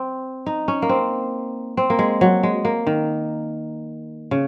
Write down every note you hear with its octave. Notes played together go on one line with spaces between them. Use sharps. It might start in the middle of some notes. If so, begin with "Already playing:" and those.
Already playing: C4
D#4
C#4
A#3
C4
C4
A#3
G#3
F#3
G#3
A#3
D#3
C#3